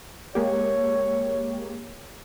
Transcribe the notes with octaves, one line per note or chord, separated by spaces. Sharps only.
G#3 A#3 G4 C#5